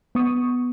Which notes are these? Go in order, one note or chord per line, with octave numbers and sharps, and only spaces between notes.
B3 C#6 D#6